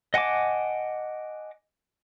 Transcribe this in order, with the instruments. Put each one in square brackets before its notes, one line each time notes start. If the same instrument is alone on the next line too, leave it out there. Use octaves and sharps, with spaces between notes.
[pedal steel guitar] D#5 F#5 G#5 A5 D6